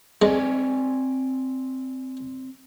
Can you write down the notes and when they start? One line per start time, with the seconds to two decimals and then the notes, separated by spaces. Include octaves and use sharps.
0.22 G#3 C4 D5 G#5